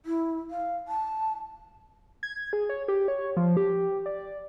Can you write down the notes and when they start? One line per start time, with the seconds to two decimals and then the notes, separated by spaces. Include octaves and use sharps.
0.06 E4
0.51 F5
0.88 A5
2.23 G#6
2.53 G#4
2.69 C#5
2.88 G4
3.08 C#5
3.37 F3
3.57 G4
4.06 D5